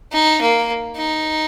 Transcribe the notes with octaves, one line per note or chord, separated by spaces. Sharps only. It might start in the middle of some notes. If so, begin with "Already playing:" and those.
D#4
A#3
D#4